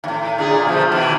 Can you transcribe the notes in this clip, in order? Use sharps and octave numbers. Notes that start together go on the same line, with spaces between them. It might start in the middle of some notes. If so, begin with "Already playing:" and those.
D#2 A2
A#2 D3 G#4
B2 F3 A3
B2 D#3 E3